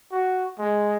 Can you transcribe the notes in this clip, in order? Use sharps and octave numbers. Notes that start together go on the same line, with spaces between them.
F#4
G#3